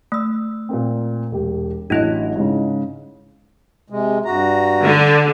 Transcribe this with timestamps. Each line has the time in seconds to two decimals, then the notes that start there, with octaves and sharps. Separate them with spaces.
0.12 A3 E6
0.69 A#2 A#3 C4
1.32 E1 G4
1.90 A1 F#3 D4 E4 D#5
2.36 G#2 C#3
3.90 C3 G#3
4.25 G2 F#4 A#5
4.83 D3